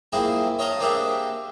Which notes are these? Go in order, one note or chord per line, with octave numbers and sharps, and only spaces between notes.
A#3 C4 E4 F4 G#4
C#5 D#5 F5 A5 A#5 D#6
A#3 C4 D4 G4 G#4 E5